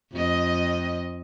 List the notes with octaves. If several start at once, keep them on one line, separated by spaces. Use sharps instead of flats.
F2 D#5